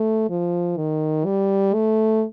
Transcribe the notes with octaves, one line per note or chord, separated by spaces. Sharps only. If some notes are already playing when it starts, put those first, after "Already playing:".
Already playing: A3
F3
D#3
G3
A3